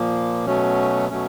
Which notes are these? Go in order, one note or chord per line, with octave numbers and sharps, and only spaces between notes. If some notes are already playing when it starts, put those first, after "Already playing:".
Already playing: A#2 F3 A#3
B2 F#3 A3 C#4
B2 F#3 A3 C#4